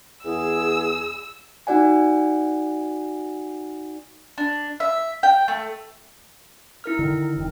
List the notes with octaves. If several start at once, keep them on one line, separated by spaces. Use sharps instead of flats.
E2 G#4 E6
D#4 F#4 D5 F#5 G#5
D4
E5
G5
A3
E4 A#4 F6
D3 D#3
F1 A#2 D#3